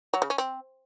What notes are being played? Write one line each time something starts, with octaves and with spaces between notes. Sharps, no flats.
F#3
C#3
C#4
C4